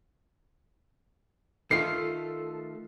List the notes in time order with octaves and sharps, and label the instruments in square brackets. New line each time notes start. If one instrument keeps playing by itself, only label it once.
[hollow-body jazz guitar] D#3 A3 F4 [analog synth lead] A4 [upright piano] C7